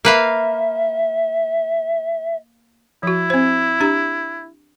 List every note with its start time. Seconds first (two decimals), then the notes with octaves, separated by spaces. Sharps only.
0.05 A#3 B4 E5 F5
3.03 F3 E4 F#4
3.30 C4 C5
3.80 D4 G4 A#5